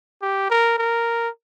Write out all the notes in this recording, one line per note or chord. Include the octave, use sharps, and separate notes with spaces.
G4
A#4
A#4